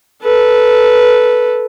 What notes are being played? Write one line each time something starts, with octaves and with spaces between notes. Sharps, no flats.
A4 B4